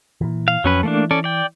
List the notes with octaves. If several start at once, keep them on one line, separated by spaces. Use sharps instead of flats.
A#2 E3
F5
F2 F#3 C#4 B4
E3 A3 A#3 D4
C#4 A4 D5
D5 G5